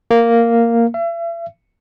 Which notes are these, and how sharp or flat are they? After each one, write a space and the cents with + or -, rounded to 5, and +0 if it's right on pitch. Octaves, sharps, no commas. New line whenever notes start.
A#3 -5
E5 +40